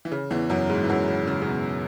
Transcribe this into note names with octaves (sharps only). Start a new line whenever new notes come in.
E3
C#3
E2 E3
F#2 F#3
G#2 G#3
E3
F#2 F#3
C#3
C#3
C#3
B2